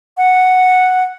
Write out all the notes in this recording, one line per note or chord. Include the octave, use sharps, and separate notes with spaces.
F#5